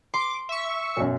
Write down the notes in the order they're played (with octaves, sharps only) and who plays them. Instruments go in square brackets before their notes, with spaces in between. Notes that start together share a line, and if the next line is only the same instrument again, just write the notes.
[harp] C6 [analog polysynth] D6
[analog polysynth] E5 C#6
[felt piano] B1 F#2